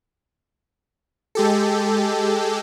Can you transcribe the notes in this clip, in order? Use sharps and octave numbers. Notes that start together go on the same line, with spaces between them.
G#3 G4 A4